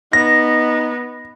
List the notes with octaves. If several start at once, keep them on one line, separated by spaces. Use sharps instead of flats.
B3 D#4 A#6